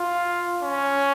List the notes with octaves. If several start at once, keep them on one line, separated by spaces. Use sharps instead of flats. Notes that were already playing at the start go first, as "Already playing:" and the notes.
Already playing: F4
C#4